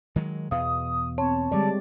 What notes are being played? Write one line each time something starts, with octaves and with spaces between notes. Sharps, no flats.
D#3 F#3 G#3
E2 B2 F5 D#6
C4 C#5 A5
D3 G3 G#3 D5